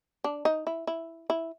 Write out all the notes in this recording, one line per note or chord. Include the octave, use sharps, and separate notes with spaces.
D4
D#4
E4
E4
E4